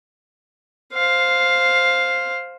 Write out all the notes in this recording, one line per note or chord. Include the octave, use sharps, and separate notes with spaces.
C5 F5